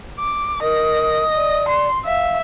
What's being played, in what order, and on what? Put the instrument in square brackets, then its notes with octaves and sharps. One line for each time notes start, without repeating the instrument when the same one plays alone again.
[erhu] D6
[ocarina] A#4 [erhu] D#5
[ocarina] D5
[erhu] C6
[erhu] E5 [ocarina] F5